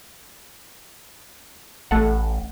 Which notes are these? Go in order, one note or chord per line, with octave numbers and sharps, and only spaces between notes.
A1 A3 A4 F#5